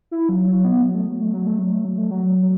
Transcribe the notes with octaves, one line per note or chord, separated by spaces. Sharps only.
E4
F#3
F#3
B3
F#3
A3
F#3
A3
F#3
A3
F#3
A3
F#3
A3
F#3
F#3